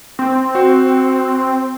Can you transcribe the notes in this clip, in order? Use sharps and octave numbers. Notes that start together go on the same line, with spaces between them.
C4
F#4 C5